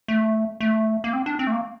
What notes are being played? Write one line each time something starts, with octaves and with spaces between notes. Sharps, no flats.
A3
A3
A#3
C4
D4
C4
A3
A#3